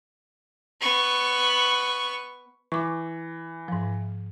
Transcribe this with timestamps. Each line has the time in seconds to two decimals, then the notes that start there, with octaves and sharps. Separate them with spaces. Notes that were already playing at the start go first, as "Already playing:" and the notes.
0.81 B3 C#6
2.72 E3 C#6 D6
3.68 G#2 F3